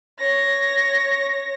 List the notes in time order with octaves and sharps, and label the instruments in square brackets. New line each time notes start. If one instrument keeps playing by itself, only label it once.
[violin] C#5 A#6